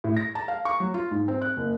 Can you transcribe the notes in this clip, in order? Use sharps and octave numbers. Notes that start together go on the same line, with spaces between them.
A2
A#6
A5
F5
C#6
F#3
F4
G#2
C4
F#6
F#1